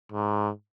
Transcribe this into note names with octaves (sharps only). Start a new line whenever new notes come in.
G#2